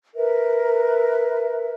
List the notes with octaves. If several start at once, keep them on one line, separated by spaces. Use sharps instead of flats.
A#4 B4 E5